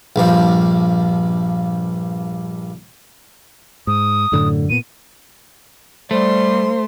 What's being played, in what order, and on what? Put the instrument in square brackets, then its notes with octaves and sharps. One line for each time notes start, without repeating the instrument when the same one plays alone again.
[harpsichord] A#1 G2 F3
[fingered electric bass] G#2 [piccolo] D#6
[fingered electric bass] F#2 A2 D3
[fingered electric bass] A#2 B3 [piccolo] D#7
[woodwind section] G3 [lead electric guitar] A3 [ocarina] C5 [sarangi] C6